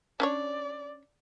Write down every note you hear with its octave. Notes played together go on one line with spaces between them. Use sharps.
C#4 D4 C#5 D5